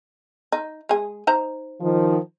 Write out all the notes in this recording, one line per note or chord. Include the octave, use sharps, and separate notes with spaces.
D#4
G#3 G#4
D#4 C5 A#5
D#3 F3